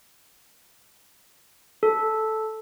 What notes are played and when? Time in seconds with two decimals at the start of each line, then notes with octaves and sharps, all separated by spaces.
1.83 A4